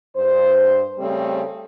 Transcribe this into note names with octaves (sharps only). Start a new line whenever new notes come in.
G2 C5
C#3 G3 A3 C4 C#5